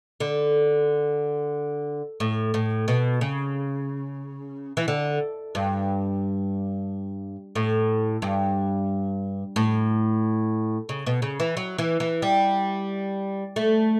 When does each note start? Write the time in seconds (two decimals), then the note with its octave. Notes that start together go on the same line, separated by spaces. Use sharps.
0.20 D3
2.20 A2
2.54 A2
2.88 B2
3.21 C#3
4.77 E3
4.88 D3
5.55 G2
7.55 A2
8.22 G2
9.56 A2
10.89 C#3
11.07 B2
11.22 C#3
11.40 E3
11.57 F#3
11.78 E3
12.00 E3
12.22 G3
13.56 A3